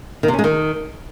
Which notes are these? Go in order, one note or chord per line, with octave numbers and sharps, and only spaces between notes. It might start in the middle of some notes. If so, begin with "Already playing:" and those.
D#3
C3
C#4
G#3
D#3